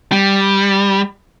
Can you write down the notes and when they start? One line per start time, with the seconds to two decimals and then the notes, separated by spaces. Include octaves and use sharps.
0.12 G3